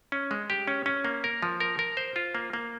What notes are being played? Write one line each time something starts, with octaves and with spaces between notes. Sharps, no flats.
C#4
G#3
G4
C#4
C#4
A#3
A#4
F3
A#4
A#4
C5
F4
A#3
A#3